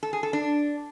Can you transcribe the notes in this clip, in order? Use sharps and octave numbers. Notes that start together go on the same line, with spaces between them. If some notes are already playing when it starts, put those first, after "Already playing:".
A4
G#4
A4
D4